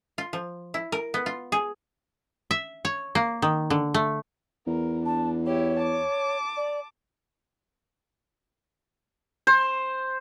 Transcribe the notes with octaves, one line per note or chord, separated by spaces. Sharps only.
F4
F3
E4
A#4
B3
F4
G#4
E5
C#5
A#3
D#3
D3
A3
E2 A#4
D4 A5
E4 G4 C#5
A5 D6
D5
C5